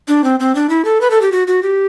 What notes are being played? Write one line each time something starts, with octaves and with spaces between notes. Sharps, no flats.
D4
C4
C4
D4
E4
A4
B4
A4
G4
F#4
F#4
G4